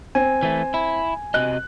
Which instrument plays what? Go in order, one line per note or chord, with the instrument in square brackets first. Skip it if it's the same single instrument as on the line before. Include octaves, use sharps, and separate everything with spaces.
[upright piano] C4 [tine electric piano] G#5
[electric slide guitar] E3 A3
E4
[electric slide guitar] C3 F#4 D#5 [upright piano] F#6